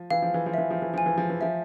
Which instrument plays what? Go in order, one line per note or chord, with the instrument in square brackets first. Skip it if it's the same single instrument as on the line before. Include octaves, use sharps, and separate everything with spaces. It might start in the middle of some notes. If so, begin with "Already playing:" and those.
Already playing: [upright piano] F3
[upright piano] E3 [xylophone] F5
[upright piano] F3
E3
F3
[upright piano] E3 [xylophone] E5
[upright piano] F3
E3
[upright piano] F3 [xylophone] G#5
[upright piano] E3
F3
E3
[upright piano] F3 [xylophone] E5